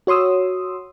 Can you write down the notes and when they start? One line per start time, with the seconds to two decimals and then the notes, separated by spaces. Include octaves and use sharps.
0.07 F#4 C#5 C6 D#6 E6